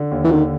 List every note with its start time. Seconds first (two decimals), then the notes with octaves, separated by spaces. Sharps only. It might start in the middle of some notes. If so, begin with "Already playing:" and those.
Already playing: D3
0.11 D#2
0.24 E3
0.31 D3 D#3